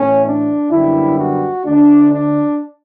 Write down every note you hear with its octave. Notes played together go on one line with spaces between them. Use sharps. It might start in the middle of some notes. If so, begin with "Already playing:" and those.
Already playing: A2 E3 A3 C#4
D4
F#2 D3 G3 B3 E4
F#4
D2 D3 A3 D4
D4